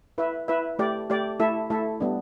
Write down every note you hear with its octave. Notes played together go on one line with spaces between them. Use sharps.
E4 B4 E5
E4 B4 E5
A3 G4 D5
A3 G4 D5
A3 E4 A4 E5
A3 E4 A4 E5
G3 B3 D4